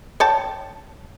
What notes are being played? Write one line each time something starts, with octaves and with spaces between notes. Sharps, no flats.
C#5 G5 A5